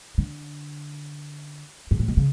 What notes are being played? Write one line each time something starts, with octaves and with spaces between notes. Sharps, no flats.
D3
G#2
A2
B2
C#3